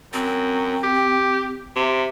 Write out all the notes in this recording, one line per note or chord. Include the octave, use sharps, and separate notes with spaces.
F#2 C4
G4
C3 E5